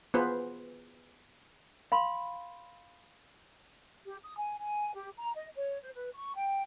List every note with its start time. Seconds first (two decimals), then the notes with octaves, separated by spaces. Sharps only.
0.14 B3 F4 G#4 B4 C5
1.92 F5 B5 C6
4.05 G4
4.23 D#6
4.37 G#5
4.58 G#5
4.94 G4
5.17 A#5
5.35 D#5
5.55 C#5
5.82 C5
5.94 B4
6.14 C#6
6.35 G5